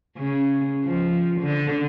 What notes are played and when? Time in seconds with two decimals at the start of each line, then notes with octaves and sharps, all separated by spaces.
0.18 C#3
0.85 F3
1.41 D3